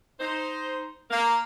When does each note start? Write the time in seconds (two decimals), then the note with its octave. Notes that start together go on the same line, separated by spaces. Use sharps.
0.19 D#4 C5
1.11 A#3